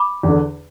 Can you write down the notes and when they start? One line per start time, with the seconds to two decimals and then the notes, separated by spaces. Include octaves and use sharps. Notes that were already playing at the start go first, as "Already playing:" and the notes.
Already playing: B5 D6
0.23 E2 D3